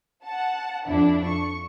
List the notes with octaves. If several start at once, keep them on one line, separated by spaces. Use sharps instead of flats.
F#5 A5
F2 D4 E4
C#6